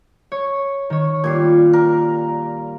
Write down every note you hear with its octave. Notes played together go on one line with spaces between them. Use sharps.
C#5
D#3 C#5
A#2 G3 G#6 C7
A#4